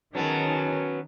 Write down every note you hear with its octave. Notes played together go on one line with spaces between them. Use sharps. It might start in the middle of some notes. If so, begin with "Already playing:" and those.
D#3 F#3 B3 C#4 G#4 A5